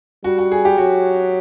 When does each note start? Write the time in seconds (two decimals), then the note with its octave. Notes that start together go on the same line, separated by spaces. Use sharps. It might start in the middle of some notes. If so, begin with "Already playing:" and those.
0.24 G3 F#4
0.39 F#4
0.52 G#4
0.65 G4
0.77 F#3 F#4